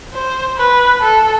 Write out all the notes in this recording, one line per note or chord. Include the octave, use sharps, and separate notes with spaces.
C5
B4
A4